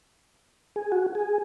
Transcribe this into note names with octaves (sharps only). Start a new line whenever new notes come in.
G#4
F#4
G#4